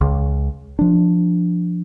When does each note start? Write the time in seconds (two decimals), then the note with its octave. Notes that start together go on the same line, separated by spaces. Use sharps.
0.01 C#2
0.79 F3 D4